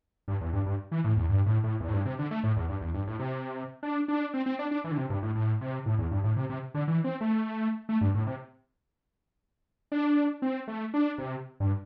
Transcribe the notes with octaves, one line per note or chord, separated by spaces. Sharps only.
G2
E2
G2
G2
E3
A2
E2
G2
A2
A2
E2
A2
G2
C3
D3
A3
A2
E2
G2
E2
G2
A2
C3
D4
D4
C4
C4
D4
D4
E3
D3
C3
G2
A2
A2
C3
A2
E2
G2
A2
C3
C3
D3
E3
C4
A3
A3
G2
A2
C3
D4
C4
A3
D4
C3
G2